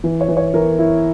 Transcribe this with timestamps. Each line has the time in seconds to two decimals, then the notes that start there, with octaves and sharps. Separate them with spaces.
0.04 E3
0.21 C#5
0.28 E3
0.37 C#5
0.54 E3 A#4
0.79 E4